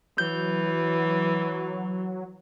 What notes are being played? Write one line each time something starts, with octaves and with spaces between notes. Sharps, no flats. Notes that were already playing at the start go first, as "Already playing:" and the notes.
E3 F#3 G6